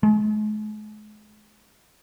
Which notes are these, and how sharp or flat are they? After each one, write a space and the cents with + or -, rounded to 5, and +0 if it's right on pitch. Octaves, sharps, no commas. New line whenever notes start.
G#3 +40